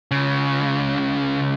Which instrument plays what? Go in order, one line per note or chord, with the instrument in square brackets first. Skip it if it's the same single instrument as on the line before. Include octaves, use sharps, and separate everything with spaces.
[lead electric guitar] C#2 C#3